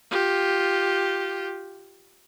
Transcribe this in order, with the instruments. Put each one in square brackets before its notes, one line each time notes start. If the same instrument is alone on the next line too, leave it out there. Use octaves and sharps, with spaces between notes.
[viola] F4 G4